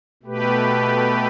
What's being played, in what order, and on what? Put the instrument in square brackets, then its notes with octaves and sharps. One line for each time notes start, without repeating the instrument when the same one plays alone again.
[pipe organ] B2 A3 G4 B4